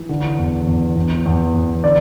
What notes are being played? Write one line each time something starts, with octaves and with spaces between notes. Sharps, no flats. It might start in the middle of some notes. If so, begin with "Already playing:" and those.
Already playing: E3
D3
E2
E2
E2
E2
E2
D3 D5